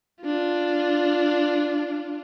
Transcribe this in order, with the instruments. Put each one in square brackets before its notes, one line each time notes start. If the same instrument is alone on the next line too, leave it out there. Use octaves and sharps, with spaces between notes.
[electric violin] D4 F4